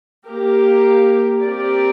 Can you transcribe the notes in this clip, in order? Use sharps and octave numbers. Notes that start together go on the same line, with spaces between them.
A#3 G4 A#4
C4 G4 A#4 D5